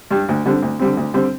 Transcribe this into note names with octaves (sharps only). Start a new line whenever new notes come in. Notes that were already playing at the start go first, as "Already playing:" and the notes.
G2 G3
D2
D3 G3 C4
D2
D3 G3 C4
D2
D3 G3 C4